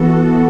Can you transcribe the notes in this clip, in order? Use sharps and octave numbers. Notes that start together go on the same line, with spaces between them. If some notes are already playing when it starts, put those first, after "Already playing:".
Already playing: E3 B3 F#4 A4